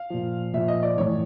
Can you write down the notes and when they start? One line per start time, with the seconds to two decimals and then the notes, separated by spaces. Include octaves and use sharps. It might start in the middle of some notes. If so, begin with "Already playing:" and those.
Already playing: F5
0.10 A#2 F3
0.54 A#2 F3 E5
0.68 D#5
0.83 D5
0.98 A2 E3 C#5